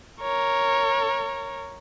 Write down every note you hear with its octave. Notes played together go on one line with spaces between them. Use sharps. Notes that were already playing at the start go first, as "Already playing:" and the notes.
A#4 C#5